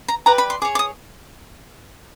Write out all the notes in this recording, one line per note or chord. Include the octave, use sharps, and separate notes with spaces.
A#5
G4 B4 D5 A#5
B5
C6
G#4 C#5 D6
D6
D#6